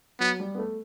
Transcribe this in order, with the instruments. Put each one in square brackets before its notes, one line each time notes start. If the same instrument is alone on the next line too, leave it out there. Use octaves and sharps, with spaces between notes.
[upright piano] F#3 [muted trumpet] B3
[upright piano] G3
B3
A3